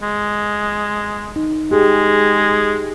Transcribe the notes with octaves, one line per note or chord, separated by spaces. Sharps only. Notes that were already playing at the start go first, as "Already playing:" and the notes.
G#3
D#4
G#3 G4 G#4